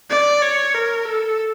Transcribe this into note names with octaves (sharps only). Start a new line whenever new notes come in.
D5
C#5
A#4
A4